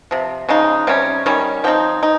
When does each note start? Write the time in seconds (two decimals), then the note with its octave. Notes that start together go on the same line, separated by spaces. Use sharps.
0.11 C3 F3
0.49 C#3 F3 G#3 D#4
0.87 C3 G3 C#4
1.26 D#3 G3 C#4
1.64 F3 C4 D#4 G5
2.03 D#4